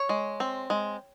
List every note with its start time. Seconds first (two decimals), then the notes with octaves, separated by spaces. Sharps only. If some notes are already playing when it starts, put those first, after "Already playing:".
Already playing: C#5
0.09 G#3
0.40 C4
0.70 G#3